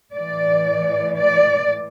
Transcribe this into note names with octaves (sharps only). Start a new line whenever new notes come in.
A2 E3 D5
D5